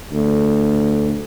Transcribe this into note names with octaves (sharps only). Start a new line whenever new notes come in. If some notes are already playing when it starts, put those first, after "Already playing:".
D2